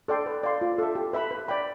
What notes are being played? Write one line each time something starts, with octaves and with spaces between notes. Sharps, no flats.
A4 D5 G5 C6
B4
D5 F5 C6
F4
A4 E5
G4
B4 E5 B5
B4
D5 G5 B5